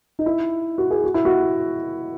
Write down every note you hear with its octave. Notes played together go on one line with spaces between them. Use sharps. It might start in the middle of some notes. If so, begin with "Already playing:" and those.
D#4
E4
F#4
G#4
F#4
E4
F#4